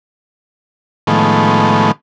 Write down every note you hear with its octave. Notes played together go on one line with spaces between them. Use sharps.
A2 D#3 F3 G#3 A3 B3